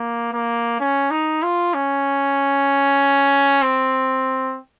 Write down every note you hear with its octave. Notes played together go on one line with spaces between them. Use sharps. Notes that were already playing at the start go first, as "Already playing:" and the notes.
Already playing: A#3
A#3
C#4
D#4
F4
C#4
C4